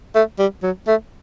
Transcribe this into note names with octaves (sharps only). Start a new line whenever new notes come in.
A3
G3
F#3
A3